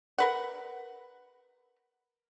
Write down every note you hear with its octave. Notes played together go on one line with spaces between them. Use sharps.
A#4 B4 F#5